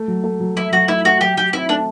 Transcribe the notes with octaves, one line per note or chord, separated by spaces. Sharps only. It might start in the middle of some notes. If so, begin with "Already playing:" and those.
Already playing: A3
F#3
A3
F#3
F#3 E4
F#3 F#4
A3 E4
A3 F#4
F#3 G4
F#3 G4
C4 E4
A3 D4